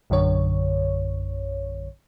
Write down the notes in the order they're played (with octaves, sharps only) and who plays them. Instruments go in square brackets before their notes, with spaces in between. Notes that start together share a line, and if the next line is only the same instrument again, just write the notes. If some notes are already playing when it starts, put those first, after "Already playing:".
[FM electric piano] A#1 F#2 D3 C#5